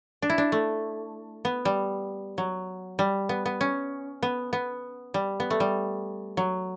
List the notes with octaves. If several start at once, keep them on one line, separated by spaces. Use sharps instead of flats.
D4
E4
D4
A3
B3
G3
F#3
G3
B3
B3
C#4
B3
B3
G3
B3
A3
G3
F#3